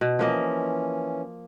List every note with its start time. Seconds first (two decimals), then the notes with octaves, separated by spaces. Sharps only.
0.01 B2
0.19 E3 F3 A#3 C#4 D#5